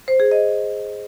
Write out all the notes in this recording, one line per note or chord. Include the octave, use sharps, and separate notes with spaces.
C5
G#4
D#5